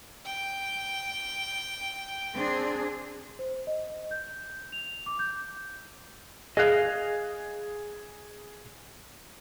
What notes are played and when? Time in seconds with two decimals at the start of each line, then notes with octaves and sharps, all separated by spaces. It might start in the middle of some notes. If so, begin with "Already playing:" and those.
0.25 G5
2.35 C4 D4 G#4
3.39 C5
3.67 D#5
4.11 G6
4.72 F7
5.06 D6
5.19 G6
6.57 G#4 D#5 F5 F#6